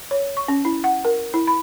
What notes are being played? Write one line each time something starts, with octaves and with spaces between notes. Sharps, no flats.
C#5
C#6
C#4
E4
F#5
A#4
E4
B5